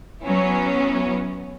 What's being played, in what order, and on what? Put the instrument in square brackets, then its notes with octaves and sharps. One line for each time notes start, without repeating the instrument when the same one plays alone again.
[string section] F#3 B3 C#4 E4